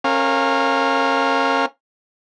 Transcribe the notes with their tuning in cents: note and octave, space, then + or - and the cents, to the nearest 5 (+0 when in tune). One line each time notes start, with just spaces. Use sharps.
C#4 -30 A#4 -20 F5 +10